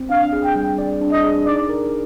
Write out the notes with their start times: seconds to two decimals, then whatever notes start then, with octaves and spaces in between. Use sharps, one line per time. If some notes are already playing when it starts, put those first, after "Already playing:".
Already playing: C4
0.10 D4 F5
0.33 G#4
0.44 G5
0.56 G3
0.78 D5
1.01 D4
1.12 D#5
1.24 G#4
1.46 D#4 D5
1.69 A#4